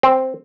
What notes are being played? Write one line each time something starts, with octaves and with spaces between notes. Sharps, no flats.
C4